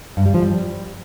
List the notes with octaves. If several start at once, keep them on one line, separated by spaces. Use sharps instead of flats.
G2
G3
F3
G3